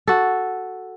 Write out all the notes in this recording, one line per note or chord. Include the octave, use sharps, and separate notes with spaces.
F#4 A4